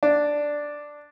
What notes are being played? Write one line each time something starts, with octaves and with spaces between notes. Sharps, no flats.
D4